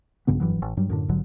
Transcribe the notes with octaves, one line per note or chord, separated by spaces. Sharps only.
A#1 G2 C#3 B3
F1 G2 E3 F#3
A1
G2 F#3 G3
F#2 A2 D3
A#1 G#2 D3 F#3